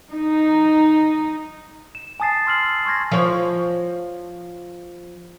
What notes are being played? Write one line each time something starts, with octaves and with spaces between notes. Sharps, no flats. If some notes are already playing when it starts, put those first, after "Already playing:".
D#4
E7
G#5 A5 D#6 A6 C7 E7
C6 E6 F6 C7 F#7
C6 C#6 F6 G#6 A#6
F3 C#5